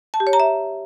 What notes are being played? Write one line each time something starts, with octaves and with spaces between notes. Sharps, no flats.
A5
G4
C#5
A#5
E5